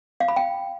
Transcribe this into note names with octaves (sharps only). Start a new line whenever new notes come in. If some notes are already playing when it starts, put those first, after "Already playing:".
F5
B5
G5